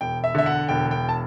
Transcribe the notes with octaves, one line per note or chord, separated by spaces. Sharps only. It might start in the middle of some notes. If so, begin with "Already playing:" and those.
E1 G5
E5
D3 E5
F#5
E1 G5
G5
A5